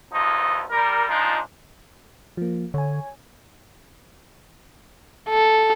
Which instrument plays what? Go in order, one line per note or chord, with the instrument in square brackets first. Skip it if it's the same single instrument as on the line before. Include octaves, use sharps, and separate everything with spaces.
[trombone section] A#1 E2 G2 F3 D#4
G3 A#4
F3 G#3 D4 D#4 F4
[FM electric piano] F3 A#3
[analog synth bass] D3 [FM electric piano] C#5 G#5
[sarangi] A4